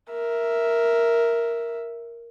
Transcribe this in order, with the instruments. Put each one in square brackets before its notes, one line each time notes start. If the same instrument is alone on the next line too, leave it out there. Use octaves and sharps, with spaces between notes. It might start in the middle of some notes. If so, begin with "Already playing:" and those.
[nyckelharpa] A#4 E5